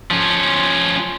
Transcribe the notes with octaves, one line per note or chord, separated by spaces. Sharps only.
F3 C#4